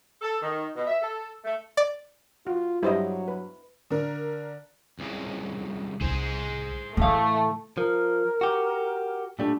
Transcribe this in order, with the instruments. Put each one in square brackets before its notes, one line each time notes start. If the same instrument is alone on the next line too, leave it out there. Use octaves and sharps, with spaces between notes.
[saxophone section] A4
D#3
B2
E5
A4
A3
[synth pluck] D5
[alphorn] F4 [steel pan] F#4
[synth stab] G2 [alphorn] F#3 [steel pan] E4 C5 D#5
[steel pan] B4
[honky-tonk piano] D3 A#4
[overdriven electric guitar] C2 C#3
[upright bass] C2 C#3 [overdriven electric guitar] G#4 C5
[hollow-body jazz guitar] A2 F5 [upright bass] C#3 E3 [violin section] A3
[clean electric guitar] F3 [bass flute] A#4
[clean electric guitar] F#4 G4
[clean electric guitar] A#2 G3 A3 [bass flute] D4